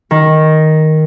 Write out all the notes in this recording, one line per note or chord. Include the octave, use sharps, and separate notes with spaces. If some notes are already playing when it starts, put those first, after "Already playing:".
D#3